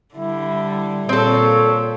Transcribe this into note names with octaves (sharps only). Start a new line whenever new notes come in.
D3 G3 E4
A#2 C4 A4 C#5